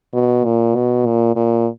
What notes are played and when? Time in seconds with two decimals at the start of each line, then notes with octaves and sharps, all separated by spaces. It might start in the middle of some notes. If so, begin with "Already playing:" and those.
0.13 B2
0.45 A#2
0.75 B2
1.06 A#2
1.36 A#2